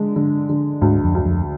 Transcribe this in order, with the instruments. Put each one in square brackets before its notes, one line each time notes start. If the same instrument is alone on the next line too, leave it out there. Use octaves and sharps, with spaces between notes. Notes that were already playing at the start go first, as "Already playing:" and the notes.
Already playing: [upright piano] D3 G#3
D3
D3
[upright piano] D2 [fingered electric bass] G#2
[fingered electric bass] F2
[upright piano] D2
[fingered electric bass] F2